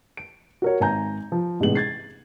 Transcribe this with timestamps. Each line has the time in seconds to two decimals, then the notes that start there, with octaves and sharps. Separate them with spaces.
0.17 D7
0.62 F#4 A#4 C#5
0.80 G#1 G#5 A#5 G6
1.32 F3
1.60 A1 G#2 C3 B3 G#4 F#7
1.75 G#6 A6 C7